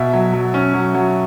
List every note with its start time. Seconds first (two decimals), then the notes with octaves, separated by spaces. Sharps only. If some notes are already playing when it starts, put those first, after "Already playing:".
Already playing: B2 E5
0.13 F#3
0.33 F#3
0.54 C#4
0.74 F#3
0.94 F#3